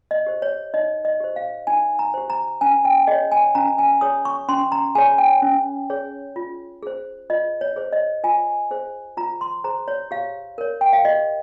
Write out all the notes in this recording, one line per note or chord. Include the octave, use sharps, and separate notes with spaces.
D#5
G4 C5
C#5
D#4 D#5
D#5
G4 C5
F5
D#4 G#5
A#5
G4 C5
A#5
C#4 G#5
G5
G#4 C#5 D#5
G#5
C#4 A#5
G#5
G#4 C#5 D#6
C#6
C#4 C6
A#5
G#4 C#5 G#5
G5
C#4
G#4 C#5
F4
G#4 C5
F4 D#5
C#5
G#4 C5
D#5
F4 G#5
G#4 C5
F4 A#5
C6
G#4 C5 A#5
C#5
G4 F5
A#4 C#5
G5
F5
G4 D#5